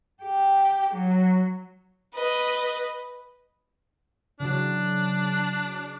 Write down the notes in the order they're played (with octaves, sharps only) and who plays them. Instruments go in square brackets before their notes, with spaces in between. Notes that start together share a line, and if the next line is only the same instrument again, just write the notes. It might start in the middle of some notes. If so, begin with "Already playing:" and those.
[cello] G4
F#3
[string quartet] B4 D#5
[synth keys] C#3 E3 F#3 [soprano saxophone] D4